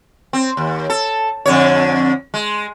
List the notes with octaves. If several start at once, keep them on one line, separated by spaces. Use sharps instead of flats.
C4
D#2
A4
F2 D3 C#5
G#3